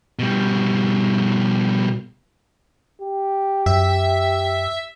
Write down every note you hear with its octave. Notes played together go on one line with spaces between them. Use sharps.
B2 G3
G4
F#2 E5